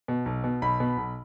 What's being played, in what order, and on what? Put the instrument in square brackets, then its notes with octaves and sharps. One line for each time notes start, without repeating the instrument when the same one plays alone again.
[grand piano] B2
B1
B2
B1 B5
B2
B1